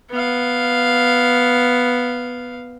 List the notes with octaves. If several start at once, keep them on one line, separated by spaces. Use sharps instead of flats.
B3 F5